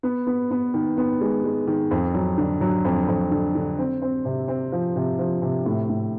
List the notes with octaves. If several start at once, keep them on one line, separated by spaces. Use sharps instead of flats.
B3
B3
B3
D#3
B3
G#3
G#3
D#3
F2
F#3
D3
F#3
F2
F2
D3
D3
C4
C4
C3
C4
F3
C3
F3
C3
A2
A2